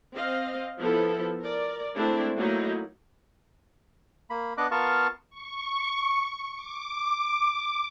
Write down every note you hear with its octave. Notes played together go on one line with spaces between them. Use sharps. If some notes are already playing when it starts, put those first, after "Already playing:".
C4 D#5 F5
F3 B3 E4 A4
A#4 D5
G#3 A3 C4 D4 E4
F#3 A3 A#3 D#4 E4
A#3 B5
B3 D4 D#5 D6 F#6
B3 F4 A#4 F5 A5 C#6
C#6
D6